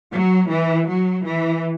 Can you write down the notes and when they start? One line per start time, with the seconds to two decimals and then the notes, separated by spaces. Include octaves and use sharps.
0.13 F#3
0.51 E3
0.89 F#3
1.26 E3